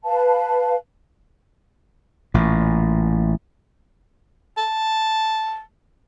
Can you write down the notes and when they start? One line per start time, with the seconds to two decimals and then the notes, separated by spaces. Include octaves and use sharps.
0.04 B4 F5 A5
2.34 A1 A#2
4.57 A5